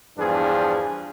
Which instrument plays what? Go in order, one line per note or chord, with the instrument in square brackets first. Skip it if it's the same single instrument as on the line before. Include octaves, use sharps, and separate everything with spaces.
[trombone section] E2 G2 F3 D4 G#4